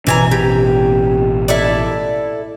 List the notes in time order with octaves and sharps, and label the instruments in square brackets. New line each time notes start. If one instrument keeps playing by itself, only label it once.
[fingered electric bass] A1 B2 C#4 [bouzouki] E3 G#5 A#5
[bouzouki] G4
E4 A4 D5